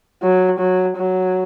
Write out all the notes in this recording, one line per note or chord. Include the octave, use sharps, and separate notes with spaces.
F#3
F#3
F#3